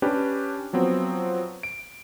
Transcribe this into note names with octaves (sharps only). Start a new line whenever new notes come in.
C#4 D4 G4 B4
F3 F#3 B3 C4
D7